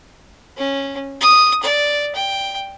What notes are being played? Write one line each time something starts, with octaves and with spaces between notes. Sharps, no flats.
C#4
D#6
D5
G5